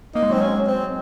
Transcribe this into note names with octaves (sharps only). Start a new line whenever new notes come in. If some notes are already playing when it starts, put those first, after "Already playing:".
A#3 D#4
G#3
F#3
C4
G#3 C#4
C4